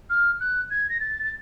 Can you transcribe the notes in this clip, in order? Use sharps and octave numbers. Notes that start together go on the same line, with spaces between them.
F6
F#6
G#6
A#6
A6
A6